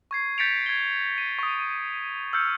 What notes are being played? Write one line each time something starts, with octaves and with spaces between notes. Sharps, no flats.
C#6 G#6 C7
G6 A6 B6 C#7 D7 F7
G#6 G7
D#7
C#6 D#6
E6 F6 G6 C#7